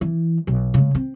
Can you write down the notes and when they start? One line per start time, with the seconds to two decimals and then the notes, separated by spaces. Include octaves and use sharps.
0.01 E3
0.47 B1
0.74 C#3 G#3
0.95 C4